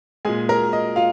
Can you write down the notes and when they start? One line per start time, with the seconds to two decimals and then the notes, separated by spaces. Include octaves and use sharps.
0.25 A#2 G#3 G#4 G#5
0.49 A#4 A#5
0.73 D#5
0.96 F4 F5